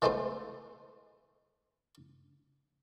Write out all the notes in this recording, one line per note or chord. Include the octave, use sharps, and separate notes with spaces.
E3 G#3 A3 B3 C5